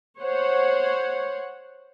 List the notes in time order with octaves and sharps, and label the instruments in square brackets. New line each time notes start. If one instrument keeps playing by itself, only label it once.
[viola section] C5 C#5 F#5